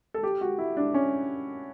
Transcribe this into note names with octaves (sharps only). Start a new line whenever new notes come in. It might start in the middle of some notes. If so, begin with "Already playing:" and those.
A4
G4
F#4
E4
D4
C#4